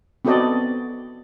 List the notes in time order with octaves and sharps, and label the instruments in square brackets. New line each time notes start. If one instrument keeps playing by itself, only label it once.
[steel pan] B3 C4 F#4 A4 D5 D#5